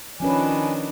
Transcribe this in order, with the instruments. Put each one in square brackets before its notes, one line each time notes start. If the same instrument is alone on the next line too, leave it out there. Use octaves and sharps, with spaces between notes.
[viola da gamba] D#3 D4 [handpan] F3 C#4 B4 [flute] G#5